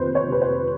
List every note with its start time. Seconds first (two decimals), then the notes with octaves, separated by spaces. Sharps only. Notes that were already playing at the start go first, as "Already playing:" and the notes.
Already playing: F2 C3 D#3 B4 C5
0.15 C#5
0.28 C3 B4
0.42 C5